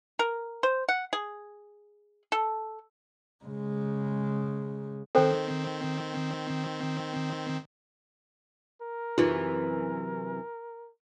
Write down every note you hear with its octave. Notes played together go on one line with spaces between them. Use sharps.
A#4
C5
F#5
G#4
A4
C#3 G#3
D#3 C4 A4 C5 G5
A#4
F#2 C3 E3 D#4 F4 G#4